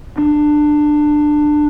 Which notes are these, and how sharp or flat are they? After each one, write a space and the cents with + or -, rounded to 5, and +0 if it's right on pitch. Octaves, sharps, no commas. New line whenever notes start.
D4 +20